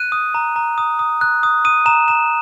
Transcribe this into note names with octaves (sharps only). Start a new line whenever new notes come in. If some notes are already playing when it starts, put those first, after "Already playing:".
Already playing: F#6 D#7
D#6
A#5
A#5
D#6
D#6
F#6
D#6
D#6 D#7
A#5 E7
A#5 E7